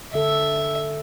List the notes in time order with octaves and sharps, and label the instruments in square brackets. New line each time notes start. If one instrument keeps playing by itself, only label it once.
[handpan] D3 A4 [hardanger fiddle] E5